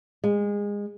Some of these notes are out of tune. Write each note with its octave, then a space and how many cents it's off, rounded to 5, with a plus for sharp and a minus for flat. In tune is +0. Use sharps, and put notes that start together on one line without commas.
G#3 -25